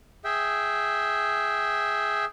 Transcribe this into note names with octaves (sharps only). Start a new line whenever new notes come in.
G#4 E5 G5